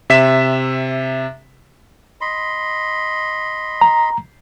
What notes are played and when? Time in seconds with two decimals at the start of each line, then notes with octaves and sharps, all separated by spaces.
0.10 C3 E5 B6 E7
2.21 D#5 B5 C6
3.81 A#5